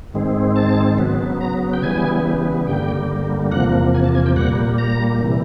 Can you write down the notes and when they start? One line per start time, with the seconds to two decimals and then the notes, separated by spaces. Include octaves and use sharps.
0.14 G#2 D#3 G#3 C4
0.56 A5
0.98 C#3 F#3 B3
1.41 A#5
1.73 G5
1.82 C#3 E3 G3 B3 G#5
2.67 G2 D3 G3 A#3 G5
3.51 E2 C3 F3 A#3 F#5
3.94 G#5
4.04 A5
4.15 G#5
4.26 G5
4.36 A#2 G3 A#3 F#5
4.78 A#5
5.21 C3 E3 G3